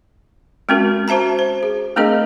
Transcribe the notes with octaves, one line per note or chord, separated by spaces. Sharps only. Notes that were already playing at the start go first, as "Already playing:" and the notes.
G#3 C4 C#4 F#4 A#4
F#4 C5 E5 A5 A#5
C5
G#4
A3 C4 D4 G#4 A#4 D#5